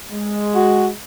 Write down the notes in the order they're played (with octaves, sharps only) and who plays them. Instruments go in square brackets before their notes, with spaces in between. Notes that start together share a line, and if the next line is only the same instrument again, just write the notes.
[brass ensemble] G#3
[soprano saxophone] F#4